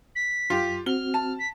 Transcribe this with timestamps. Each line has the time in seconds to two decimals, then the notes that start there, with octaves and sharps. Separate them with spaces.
0.16 B6
0.50 F#2 F4 G4
0.86 C4 F#4 F6 G7
1.14 A5
1.39 B6